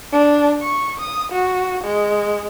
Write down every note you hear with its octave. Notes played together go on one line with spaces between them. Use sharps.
D4
C#6
D#6
F#4
G#3